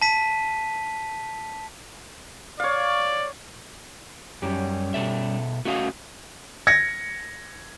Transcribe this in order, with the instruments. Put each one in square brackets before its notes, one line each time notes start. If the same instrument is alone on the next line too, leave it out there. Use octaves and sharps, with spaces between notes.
[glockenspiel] A5 B6 D#7
[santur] C#5 F5 [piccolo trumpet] D5
[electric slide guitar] F#2 [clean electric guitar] G3 C#4 G4
[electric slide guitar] B2 A4 E5
[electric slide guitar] A3 C#4 F5 [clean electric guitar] F#4 D#5 G#5
[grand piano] G#6 A#6 C#7